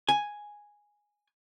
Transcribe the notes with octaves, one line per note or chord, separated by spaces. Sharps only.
G#5